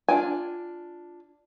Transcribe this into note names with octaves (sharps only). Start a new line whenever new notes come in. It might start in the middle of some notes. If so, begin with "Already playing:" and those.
D4 F4 G5 G#5